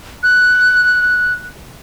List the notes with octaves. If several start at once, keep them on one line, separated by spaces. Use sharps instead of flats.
F#6